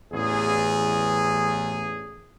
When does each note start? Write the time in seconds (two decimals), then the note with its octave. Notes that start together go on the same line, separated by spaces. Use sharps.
0.12 A1 E2 G#4